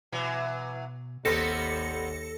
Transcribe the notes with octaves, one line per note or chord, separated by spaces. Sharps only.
B2 E3 F#3
G#1 D#2 G3 B3 C4 A4 A#6 C#7